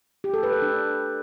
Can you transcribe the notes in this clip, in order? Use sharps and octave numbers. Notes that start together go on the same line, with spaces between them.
G4
A4
B4
A4
D4